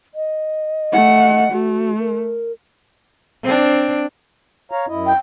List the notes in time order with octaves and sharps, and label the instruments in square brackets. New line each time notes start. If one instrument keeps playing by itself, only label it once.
[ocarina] D#5
[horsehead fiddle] A3 F#5
[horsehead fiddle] A3 [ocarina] F#4
[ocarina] A#4
[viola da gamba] C4 D4
[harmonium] C#5 F5 A#5
F#2 E4 D#5
[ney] G5